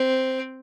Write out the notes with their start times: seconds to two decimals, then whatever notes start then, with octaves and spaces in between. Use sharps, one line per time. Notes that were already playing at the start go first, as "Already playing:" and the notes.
Already playing: C4